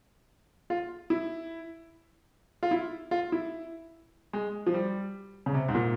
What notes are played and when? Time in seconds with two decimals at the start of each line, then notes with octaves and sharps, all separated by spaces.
0.70 F4
1.10 E4
2.63 F4
2.71 E4
3.11 F4
3.32 E4
4.33 G#3
4.67 F3
4.74 G3
5.46 C#3
5.54 C3
5.68 G#2
5.75 A#2